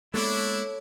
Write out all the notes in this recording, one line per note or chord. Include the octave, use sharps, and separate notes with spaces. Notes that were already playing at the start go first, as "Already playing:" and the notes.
G#3 A#3 B3 D4 E4 A4 C#5 D6